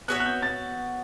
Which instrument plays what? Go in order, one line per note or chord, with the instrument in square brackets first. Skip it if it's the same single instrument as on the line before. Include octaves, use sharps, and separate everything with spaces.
[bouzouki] B3 F#4 C#5 E5 [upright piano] F#6
[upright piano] F#6
G6
A6